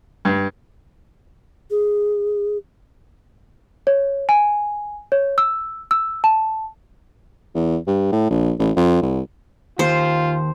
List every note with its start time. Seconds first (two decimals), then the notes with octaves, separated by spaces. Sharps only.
0.25 G2
1.71 G#4
3.87 C#5
4.29 G#5
5.12 C#5
5.38 E6
5.91 E6
6.24 A5
7.55 E2
7.88 G2
8.12 A2
8.31 A#1
8.59 A1
8.76 F2
9.02 C2
9.79 D#2 F4 C5